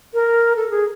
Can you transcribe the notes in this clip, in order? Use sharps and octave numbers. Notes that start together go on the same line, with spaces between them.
A#4
A4
G#4